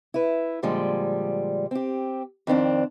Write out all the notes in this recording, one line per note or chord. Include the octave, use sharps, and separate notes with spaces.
E4 B4
A#2 D3 F3 G3 G#3
C4 G4
F2 D#3 C4 D4